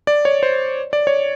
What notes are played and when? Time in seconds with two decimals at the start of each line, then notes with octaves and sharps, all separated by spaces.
0.07 D5
0.25 C#5
0.43 C5
0.93 D5
1.07 C#5